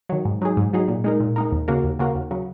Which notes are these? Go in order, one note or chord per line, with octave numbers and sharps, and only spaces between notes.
D#3 F#3
G#2
F#3 D#4 G#4
G#2
F#3 D#4 G#4
A#2
G#3 D#4 A#4
A#2
G#3 D#4 A#4
D#2
C#3 A#3 F#4 A#4
D#2
C#3 A#3 F#4 A#4
D#2
C#3 F#3